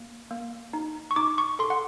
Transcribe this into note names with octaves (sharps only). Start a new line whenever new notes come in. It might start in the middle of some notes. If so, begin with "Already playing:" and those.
Already playing: A#3
A#3
D#4
C#6
D#4 D6
C#6
A4 C6
F#5